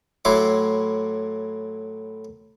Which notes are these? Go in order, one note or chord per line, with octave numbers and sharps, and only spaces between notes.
A2 F#3 E4 C6 D6